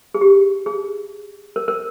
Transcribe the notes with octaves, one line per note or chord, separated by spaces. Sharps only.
G#4
G4
G#4
A#4
A#4